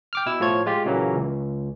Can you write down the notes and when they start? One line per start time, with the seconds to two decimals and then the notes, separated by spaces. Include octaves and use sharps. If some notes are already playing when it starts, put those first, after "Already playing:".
0.13 G5 D6 F6
0.26 B2 E4 E6
0.40 A2 F3 F4 C#5 G#6
0.66 G#3 F4 G4
0.85 A#2 C#3 E3 F#3 A#3
1.15 C#2